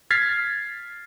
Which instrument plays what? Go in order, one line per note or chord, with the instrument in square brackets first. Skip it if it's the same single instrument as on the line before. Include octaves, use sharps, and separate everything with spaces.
[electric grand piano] F6 G#6 A6 B6 C7